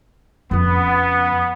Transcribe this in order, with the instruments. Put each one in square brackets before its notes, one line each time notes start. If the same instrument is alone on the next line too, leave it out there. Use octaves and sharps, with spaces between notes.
[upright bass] F2 C#3 [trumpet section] B3